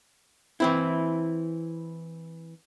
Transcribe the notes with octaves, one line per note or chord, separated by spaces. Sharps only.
E3 C4 E4